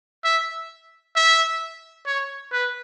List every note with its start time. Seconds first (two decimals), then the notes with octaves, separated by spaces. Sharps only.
0.24 E5
1.16 E5
2.06 C#5
2.52 B4